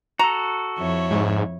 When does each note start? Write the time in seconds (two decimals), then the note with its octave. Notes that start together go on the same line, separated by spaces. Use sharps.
0.19 F#4 A4 A#5
0.78 F2 E4 C#5
1.11 G#2